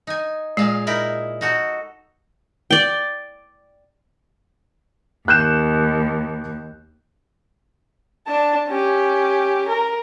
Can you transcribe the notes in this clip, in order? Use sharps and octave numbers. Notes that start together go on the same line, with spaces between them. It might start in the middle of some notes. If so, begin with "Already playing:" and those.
D#4 G#5
A#2 G#3 G#4 F5
D#4 E4 A#4
D#4 F#4 A4
D5 G5
D#2 F#6 G6 E7
D4 A5
C#4 G4
A#4